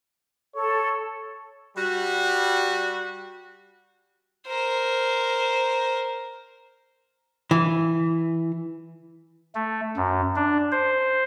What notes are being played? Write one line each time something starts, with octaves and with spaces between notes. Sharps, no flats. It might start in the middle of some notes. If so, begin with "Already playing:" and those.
A4 C#5
G3 F#4
A#4 C5
E3
A3
F#2
D4
C5